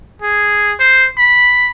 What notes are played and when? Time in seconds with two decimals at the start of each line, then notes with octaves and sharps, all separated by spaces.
0.22 G#4
0.80 C5
1.18 B5